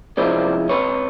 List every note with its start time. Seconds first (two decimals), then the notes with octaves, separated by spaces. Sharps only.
0.17 C3 F3 G#3 C#4 E4 C5 D5
0.69 C#2 C3 B4 C#5